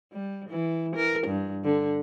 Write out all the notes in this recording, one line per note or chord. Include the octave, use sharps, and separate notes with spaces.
G3
E3
A#4
G2
D3